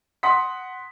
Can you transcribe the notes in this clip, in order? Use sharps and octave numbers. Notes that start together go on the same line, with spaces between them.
F#5 C6 D#6 B6